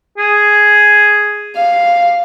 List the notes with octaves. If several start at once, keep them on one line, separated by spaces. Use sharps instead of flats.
G#4
F5